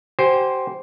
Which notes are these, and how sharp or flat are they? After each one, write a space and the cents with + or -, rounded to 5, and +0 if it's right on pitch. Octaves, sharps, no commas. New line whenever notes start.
G4 -40 C5 +0 G#5 -35